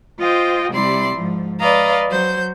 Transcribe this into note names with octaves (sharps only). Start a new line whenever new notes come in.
F4 C5 D#5 G5
C3 G3 E4 D5 C6
G#2 F3
B4 D5 D#5 F5 A#5
F#3 C5 G6